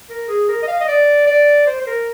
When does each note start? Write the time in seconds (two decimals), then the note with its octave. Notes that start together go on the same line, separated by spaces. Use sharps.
0.09 A#4
0.28 G#4
0.48 A#4
0.63 D#5
0.68 F5
0.80 D#5
0.88 D5
1.27 D5
1.66 C5
1.81 C5
1.87 A#4